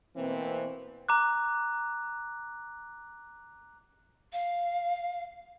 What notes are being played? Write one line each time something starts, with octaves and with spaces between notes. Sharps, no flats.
B2 E3 A#3 C4
A#5 D6 F#6
F5